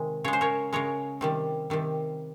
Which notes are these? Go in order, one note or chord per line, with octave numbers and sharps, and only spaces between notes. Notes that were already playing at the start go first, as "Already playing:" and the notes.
Already playing: C3 D#3 G#3
C#3 G#3 C#5
C5
A#4 C#5
C#3 G#3 A#4 C#5
C3 D#3 G3
C3 D#3 G3